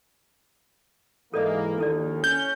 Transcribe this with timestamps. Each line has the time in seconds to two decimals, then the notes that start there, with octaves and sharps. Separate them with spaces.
1.34 G#2 E3 A#3 A4 D5 D#5
1.78 A#1 D#2 D#3 E4 A4 D5
2.24 C#4 G6